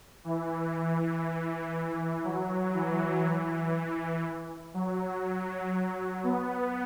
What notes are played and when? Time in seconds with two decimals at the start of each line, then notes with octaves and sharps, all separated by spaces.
0.24 E3
0.74 E3
2.24 F#3
2.74 E3
3.24 E3
4.74 F#3
6.24 B3